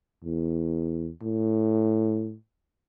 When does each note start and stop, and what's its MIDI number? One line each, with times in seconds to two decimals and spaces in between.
0.24 1.09 40
1.23 2.34 45